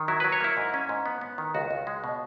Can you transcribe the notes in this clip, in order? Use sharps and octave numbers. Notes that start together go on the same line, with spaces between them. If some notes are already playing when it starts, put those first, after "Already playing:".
Already playing: D#3
F#3 E4
F#3 B4
C#5
A#3 E4
G#2
C#4
G#2
B3
B3
D#3
C#2 F#4
C#2
G#3
B2